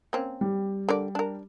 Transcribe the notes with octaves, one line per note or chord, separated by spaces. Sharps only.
A#3 C4 C#4
G3
D3 A#4 D5
D4 A#4